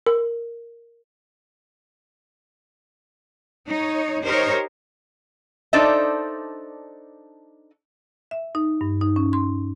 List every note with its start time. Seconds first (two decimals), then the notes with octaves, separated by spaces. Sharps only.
0.07 A#4
3.69 D#4 C#5
4.24 D#4 G4 A#4 C5 C#5
5.73 D4 D#4 A4 C5 D5 E5
8.31 E5
8.55 D#4
8.81 G2
9.01 D#4
9.16 C#4
9.33 C6